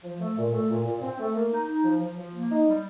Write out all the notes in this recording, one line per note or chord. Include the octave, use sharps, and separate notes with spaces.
F3
A3
A#2
A3
A#2
A#2
C4
A3
A#3
D#4
D#4
F3
F3
F3
A#3
D#4
G3